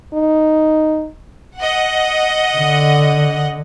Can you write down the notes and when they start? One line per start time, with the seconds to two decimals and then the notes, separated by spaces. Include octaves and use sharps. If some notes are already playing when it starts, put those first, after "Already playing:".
0.14 D#4
1.57 D#5 F#5
2.57 D3